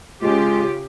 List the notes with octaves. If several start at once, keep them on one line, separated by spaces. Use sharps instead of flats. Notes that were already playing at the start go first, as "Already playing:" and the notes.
C#3 G#3 F4 G4